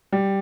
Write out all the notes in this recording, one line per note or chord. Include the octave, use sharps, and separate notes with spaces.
G3